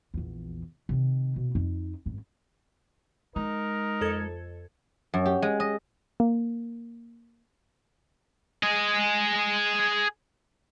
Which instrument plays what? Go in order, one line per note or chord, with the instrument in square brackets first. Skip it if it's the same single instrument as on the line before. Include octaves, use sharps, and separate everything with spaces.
[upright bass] A#1 E2
C3 D#3
B2
F2 D#4
G#1 F#2
[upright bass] G#3 [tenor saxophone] D#4 [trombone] A#4
[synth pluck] F2 A4 G#6
[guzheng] F#2
G4
G#3
D#5
[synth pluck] A#3
[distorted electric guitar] G#4 D#5